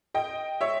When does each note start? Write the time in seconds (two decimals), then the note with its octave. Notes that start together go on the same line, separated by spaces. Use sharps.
0.14 D#5 G5
0.61 C#5 E5